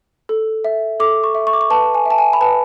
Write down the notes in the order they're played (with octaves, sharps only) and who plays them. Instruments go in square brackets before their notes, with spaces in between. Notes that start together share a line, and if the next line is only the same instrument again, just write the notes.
[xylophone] A4
E5
A4 D6
C#6
E5
C#6
D6
C#6
B4 A5
G#5
E5
A5
G#5
B5
B4 A5